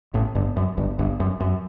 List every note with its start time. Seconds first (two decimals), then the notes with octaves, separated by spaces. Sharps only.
0.14 A1 A2
0.35 G1 G2
0.57 F#2
0.77 G1 G2
0.99 G1 G2
1.20 F#2
1.40 F#2